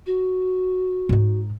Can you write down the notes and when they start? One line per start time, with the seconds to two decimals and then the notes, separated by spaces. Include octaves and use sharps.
0.06 F#4
1.09 G#2 D#4